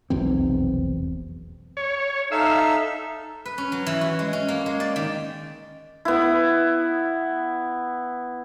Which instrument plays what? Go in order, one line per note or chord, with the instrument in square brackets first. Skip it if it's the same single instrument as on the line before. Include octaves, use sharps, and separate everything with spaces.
[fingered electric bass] F1 B1 E2 C4
[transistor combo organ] C#5
[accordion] D#4 A4 E5 [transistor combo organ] F5 E6
[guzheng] B4
C#4
F#3
E3
F#4
G#3
C#4
A#3
G#3
D5
D#3
[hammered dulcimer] B3 E4